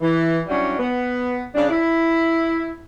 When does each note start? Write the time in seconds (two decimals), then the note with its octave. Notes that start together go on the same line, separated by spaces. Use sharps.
0.02 E3
0.48 F#3 G3 C#4 D4 E4
0.79 B3
1.55 C#3 G3 D4
1.69 E4